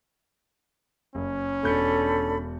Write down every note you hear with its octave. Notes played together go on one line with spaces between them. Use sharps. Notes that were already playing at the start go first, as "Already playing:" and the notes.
F#1 C#4
E1 D4 A4 B5 G6 C#7